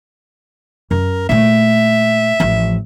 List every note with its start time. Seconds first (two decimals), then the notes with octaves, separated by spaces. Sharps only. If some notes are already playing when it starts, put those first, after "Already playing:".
0.91 F#2 A#4
1.29 A#2 A3 E5
2.40 A1 F3